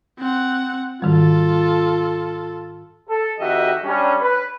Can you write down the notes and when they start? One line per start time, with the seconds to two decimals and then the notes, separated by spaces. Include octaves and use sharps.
0.19 C4 F#5
1.02 G#2 D#3 G3 F4 A4
3.09 A4
3.38 F2 D#3 F#4 G4 D#5 E5
3.84 G3 C#4 D4
4.21 B4